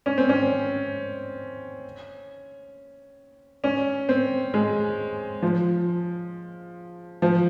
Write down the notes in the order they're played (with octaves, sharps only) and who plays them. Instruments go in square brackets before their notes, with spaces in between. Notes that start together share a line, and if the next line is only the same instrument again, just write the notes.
[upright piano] C#4
C4
C#4
C#4
C4
G#3
F3
F3